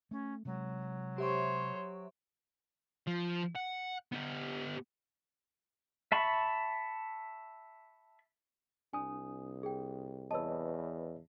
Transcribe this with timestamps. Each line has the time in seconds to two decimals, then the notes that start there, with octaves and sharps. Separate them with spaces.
0.11 A3 C#4
0.45 C3 F#3 G#3
1.18 G4 C5 C#5 E5 C#6
3.07 F3
3.55 F#5
4.12 B3 G4
6.12 E5 A5 B5 C#6
8.93 C2 D4 G#5 D#6
9.63 G#4 G5
10.31 E2 B4 C#5 D#5 A5 E6